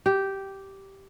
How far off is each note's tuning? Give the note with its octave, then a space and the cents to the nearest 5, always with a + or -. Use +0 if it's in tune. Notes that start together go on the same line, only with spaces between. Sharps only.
G4 -10